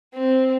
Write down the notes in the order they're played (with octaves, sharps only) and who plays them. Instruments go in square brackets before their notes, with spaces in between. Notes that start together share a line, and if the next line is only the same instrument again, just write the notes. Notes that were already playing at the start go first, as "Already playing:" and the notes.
[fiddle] C4